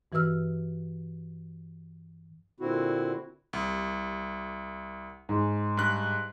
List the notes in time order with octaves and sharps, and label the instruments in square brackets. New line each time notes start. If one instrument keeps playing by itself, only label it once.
[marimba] G2 E3 F#4 B4 E6 F6
[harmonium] A#2 D3 C4 E4 F#4
[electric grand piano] C2
[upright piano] G#2
[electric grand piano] G2 F#6